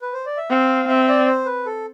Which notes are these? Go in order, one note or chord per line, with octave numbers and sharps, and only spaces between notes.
B4
C5
D5
E5
C4 F5
C4 E5
D5
C5
B4
A4